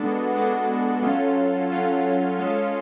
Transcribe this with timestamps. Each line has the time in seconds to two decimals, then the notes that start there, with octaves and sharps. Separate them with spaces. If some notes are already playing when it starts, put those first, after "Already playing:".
Already playing: G#3 B3 D4 F#4 A4
0.33 G#3 B3 D4 F#4 A4
1.02 F#3 C#4 F4 A4
1.70 F#3 C#4 F4 A4
2.39 G#3 C#4 F4 A4